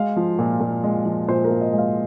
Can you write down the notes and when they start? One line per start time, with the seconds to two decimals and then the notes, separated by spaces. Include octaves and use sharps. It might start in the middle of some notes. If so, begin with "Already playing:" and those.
Already playing: G#3 F5
0.16 F3
0.39 A#2
0.61 A#2
0.84 G#3
1.05 F3
1.29 A#2 C5
1.44 A#4
1.51 A#2
1.61 D#5
1.73 G#3
1.78 F5